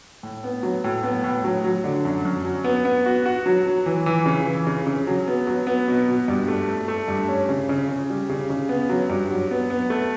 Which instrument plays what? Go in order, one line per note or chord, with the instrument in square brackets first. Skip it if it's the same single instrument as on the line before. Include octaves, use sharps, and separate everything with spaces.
[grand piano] A2
B3
F#3
A2
B3
A2
F#3
F#3
D3
F#2
F#2
F#3
B3
B3
F#4
F#4
F#3
F#3
E3
E3
C#3
E3
C#3
C#3
F#3
B3
F#3
B3
B2
B2
G2
A3
A3
A3
G2
C#4
C#3
C#3
C#3
G3
C#3
C#3
B3
F#3
G2
F#3
B3
B3
A3